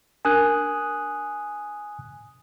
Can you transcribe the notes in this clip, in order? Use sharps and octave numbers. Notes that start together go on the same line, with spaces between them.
D4 A#4 G#5 D#6 F#6